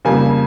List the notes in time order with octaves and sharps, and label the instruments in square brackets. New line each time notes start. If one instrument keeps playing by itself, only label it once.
[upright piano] F2 C#3 G3 A#3 G#5